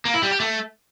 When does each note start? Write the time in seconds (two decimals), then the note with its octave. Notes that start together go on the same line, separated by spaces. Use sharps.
0.05 A#3
0.14 E4
0.23 G3
0.31 G4
0.40 A3